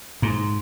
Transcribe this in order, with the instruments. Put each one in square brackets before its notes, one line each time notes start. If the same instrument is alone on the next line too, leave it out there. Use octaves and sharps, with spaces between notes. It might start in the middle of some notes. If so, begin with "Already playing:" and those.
[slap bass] G#2